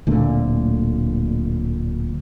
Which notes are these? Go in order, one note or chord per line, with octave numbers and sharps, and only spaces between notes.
D1 A#2 D3 A3